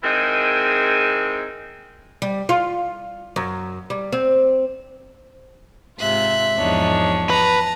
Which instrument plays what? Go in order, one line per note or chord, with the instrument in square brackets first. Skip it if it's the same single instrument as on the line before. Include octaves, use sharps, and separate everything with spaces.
[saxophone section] G#3 C4 D#4 E4 G#4 A#4
[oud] G3
F4
F#2
G3
C4
[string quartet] G#2 C3 F4 [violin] E5 F#6
[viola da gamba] E2 G#2 D#4 [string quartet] F3 D4 C#5
[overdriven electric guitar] B4 [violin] A5 A#5